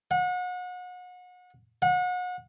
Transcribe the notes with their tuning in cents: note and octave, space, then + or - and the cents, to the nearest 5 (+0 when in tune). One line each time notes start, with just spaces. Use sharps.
F#5 -35
F#5 -35